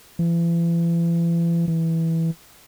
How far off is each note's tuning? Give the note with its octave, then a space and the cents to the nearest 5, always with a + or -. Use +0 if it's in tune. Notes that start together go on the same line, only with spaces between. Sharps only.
E3 +40
E3 -10